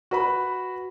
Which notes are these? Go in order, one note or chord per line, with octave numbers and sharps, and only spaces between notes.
F#4 B4 B5